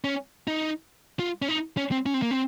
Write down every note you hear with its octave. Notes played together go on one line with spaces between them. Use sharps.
C#4
D#4
F4
C#4
D#4
C#4
C4
C#4
C4
A#3
C4